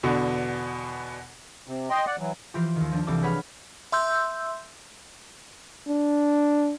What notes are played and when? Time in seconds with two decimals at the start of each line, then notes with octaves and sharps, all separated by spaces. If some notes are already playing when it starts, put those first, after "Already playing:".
0.03 E2 B2 D3
1.67 C3
1.90 D#5 G5 C6
2.07 D5 F#5
2.19 E3 F#3
2.54 E3 F3 F4 G4
2.76 D#2 D#3
2.92 F3 D4
3.07 C2 E3 C4 A4 D6
3.22 G#4 B4 C#5 F#5 B5 F6
3.92 E5 C6 E6 G6
5.88 D4